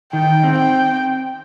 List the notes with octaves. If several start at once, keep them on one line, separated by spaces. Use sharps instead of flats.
D#3 G5
C4
G5